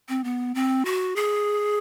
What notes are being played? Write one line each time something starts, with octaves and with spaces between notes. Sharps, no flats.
C4
B3
C4
F#4
G#4